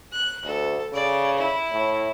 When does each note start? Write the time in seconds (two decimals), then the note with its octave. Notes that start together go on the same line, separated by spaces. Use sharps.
0.13 F#6
0.45 D2 A4
0.93 C#3 D5
1.36 E4
1.72 A2